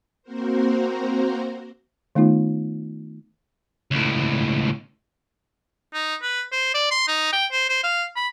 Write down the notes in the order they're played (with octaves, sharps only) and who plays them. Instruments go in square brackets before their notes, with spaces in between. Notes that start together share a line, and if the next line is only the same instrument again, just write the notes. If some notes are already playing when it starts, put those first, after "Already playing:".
[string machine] A#3 C4 F#4 A#4 C5
[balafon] D#3 A3 B3 D#4 F4
[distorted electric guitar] C#2 A2
[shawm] D#4
B4
C5
D5
C6
D#4
G5
C5
C5
F5
B5